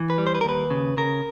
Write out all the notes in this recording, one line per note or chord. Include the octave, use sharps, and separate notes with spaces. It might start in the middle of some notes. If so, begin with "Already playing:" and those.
Already playing: E3
B4
G3
C5
B4
A#4
D#2 B4
C#3
C#3 A#4